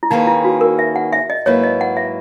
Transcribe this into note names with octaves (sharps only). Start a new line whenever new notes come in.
E4
D#3 A#3 C#4 D#4 G#4 B4
E4
F#4
A#4
E5
F#5
E5
D#5
G#2 F#3 A#3 E4 B4 C#5
D#5
F#5
E5